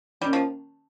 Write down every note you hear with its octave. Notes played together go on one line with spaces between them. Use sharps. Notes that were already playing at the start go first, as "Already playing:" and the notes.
D#3 G3 A#3 C#4
F3